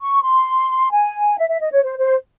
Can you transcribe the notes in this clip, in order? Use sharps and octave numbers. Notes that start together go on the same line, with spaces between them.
C#6
C6
G#5
E5
E5
D#5
C#5
C5
C5